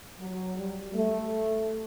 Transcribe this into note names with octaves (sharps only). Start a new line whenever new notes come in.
F#3
G3
A3